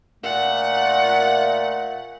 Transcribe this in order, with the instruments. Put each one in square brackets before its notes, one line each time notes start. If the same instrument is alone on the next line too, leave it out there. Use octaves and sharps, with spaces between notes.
[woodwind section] A#2 A3 [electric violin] F#5